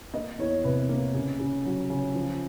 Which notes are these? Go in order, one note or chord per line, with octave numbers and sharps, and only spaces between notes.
A#3 D#5
E2 C#5
C3 B4
A#3
C#3
C#3
F#3
C#3
F3